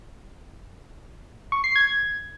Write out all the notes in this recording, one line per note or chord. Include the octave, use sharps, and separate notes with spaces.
C#6
C7
G#6